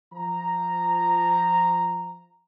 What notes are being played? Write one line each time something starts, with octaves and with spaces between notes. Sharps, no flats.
F3 A#5